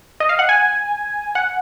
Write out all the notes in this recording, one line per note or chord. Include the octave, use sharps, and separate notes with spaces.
D#5
F5
F#5
G#5
F#5